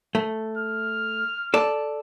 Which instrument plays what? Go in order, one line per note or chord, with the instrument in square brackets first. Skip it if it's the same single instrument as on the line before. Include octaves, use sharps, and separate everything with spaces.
[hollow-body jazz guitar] A3
[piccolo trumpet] F6
[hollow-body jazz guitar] A4 D5